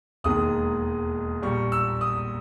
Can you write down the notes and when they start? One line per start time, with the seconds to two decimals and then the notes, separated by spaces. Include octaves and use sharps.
0.24 E1 D#2 D#3 G#3 D#6
1.42 A#1 A#2 G3 C#6
1.72 E6
2.01 D#6